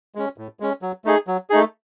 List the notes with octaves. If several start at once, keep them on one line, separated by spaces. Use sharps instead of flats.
G#3 C#4
A2
G#3 C#4
F#3
A3 D#4 G#4
F#3
A3 D#4 G#4